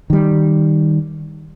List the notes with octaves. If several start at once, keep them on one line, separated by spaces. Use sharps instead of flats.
D#3 G3